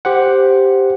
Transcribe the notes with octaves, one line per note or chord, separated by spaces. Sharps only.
G4 C5 F#5